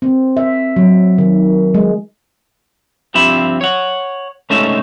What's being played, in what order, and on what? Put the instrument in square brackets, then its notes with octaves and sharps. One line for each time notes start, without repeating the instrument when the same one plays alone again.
[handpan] C4
E5
F#3
D#3
G#3
[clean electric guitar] G2 F3 C4 G4 E5 B5
C#5 F#5
G#3 A3 C#4 D#4 A4 E5